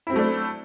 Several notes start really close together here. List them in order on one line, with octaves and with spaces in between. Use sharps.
E4 C4 F#3 A3 D4